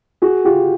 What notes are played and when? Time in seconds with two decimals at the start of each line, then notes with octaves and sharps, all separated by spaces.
0.22 F#4 G#4
0.45 F4 G4